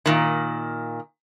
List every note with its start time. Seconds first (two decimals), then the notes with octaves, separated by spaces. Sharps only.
0.06 A#2 D#3